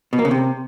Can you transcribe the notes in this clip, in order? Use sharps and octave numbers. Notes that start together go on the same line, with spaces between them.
B2
A#3
C#3
C3